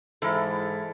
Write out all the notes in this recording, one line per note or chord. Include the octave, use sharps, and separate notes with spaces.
G#2 E3 E4 A4 A#4